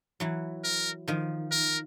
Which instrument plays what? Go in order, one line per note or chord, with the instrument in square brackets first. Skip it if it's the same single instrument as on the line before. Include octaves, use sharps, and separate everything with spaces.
[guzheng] E3 F#3
[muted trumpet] A#4
[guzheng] D#3 F3
[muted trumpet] A#4